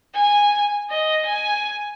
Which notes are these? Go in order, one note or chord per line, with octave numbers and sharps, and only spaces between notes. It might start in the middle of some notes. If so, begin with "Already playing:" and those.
G#5
D#5
G#5